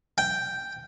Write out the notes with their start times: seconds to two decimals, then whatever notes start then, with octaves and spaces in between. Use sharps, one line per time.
0.18 G5